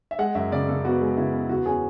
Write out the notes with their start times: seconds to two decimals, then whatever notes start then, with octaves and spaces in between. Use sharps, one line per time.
0.11 E5
0.19 G#3 F#5
0.35 F#2 E5
0.52 C#3 D5
0.69 C#3 A4
0.85 B3 F#4
1.01 G#3
1.17 C#3 E4
1.33 B3
1.49 E2 F#4
1.66 C#4 G#4